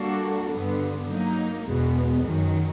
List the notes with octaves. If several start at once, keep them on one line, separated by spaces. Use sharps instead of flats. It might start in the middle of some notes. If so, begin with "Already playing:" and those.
Already playing: G3 A#3 D4 F#4 A4
G2 D3 G3 B3
F#3 A#3 D#4
E2 B2 G#3 B3
F#2 D#3 F#3